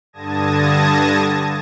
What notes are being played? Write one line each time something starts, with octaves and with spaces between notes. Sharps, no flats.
G2 D3 A5 D#6 G#6 A#6